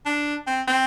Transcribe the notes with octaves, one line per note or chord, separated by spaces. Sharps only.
D4
C4
C4